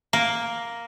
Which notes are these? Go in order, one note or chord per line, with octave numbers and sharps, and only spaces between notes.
A#3